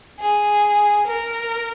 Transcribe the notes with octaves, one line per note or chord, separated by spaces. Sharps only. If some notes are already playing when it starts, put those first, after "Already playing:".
G#4
A#4